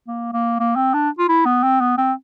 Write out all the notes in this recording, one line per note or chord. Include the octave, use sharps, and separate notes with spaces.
A#3
A#3
A#3
C4
D4
F4
E4
B3
C4
B3
C4